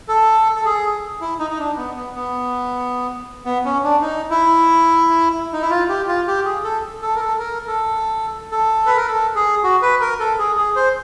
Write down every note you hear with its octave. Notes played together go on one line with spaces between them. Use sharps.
A4
A4
G#4
E4
D#4
D#4
D4
B3
B3
B3
B3
C#4
D4
D#4
E4
D#4
E4
F4
G4
F4
G4
G#4
A4
A4
A#4
A4
A#4
A4
A4
B4
A#4
A4
G#4
F#4
B4
A#4
A4
G#4
G#4
C5